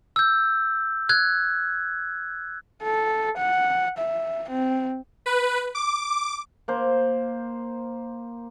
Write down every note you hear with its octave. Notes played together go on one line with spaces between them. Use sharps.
E6 G6
F#6 G#6
A4
F#5
E5
C4
B4
D6
A#3 C5